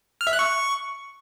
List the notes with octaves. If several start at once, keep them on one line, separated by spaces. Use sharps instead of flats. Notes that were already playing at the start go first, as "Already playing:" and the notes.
F6
E5
F#6
C#6